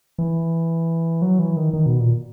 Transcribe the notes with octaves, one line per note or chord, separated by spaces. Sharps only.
E3
F#3
E3
D#3
D#3
B2
A#2